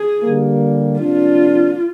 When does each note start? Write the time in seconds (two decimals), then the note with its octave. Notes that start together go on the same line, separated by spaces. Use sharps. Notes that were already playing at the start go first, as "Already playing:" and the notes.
Already playing: G#4
0.23 D3 G3 A#3
1.00 C3 F3 A#3 D4 F4